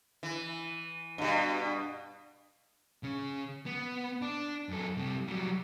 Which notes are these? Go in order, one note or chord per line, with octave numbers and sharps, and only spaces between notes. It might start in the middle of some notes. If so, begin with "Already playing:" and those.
E3
G2 B2
C#3 C#4
B3
D4
F#2 A4
C3 G3
F#3 G3